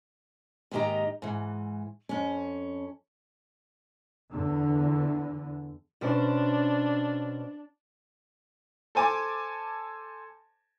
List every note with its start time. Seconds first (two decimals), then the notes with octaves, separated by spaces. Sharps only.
0.71 D#2 G#2 D#3 G4 D#5 A#5
1.22 G#2 E3
2.09 F2 C#4
4.31 E2 D3
6.01 B2 C#4 D4 C5
8.95 A4 C5 G#5 A5 D6